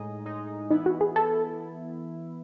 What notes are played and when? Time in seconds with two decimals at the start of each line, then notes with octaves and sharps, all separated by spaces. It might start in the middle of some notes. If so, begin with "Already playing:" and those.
Already playing: A2 G#3 D#4 G#4 D#5
0.25 A2 G#3 D#4 G#4 D#5
0.70 E3 B3 D#4 E4
0.86 F#4
1.01 G#4
1.16 E3 B3 E4 A4